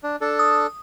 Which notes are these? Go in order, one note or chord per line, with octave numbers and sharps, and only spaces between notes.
D4
D4 A4
D#6